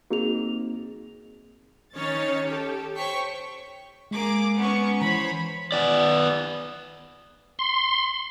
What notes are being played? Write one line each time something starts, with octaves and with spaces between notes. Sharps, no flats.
A#3 C4 D#4 F#4 G#4 F7
D#3 C#4 D#4 C#5 A6
G4 A4
C5 C#5 G5 C#6 B6
G#3 A#3 G#4 D6
B3 C#4 C#6
E3 C5 C#5 B5
B3 D5
C6